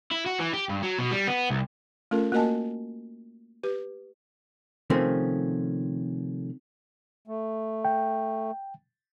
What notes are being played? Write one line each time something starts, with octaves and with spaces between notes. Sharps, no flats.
E4
F#4
E3
G4
G2
F#3
B2
G3
B3
C2
A3 C#4 F4 A4 A#4
A#3 F#4 A#4 D#5 G#5 A5
G4 B4
C3 D#3 F3 A3 C4 C#4
A3
G5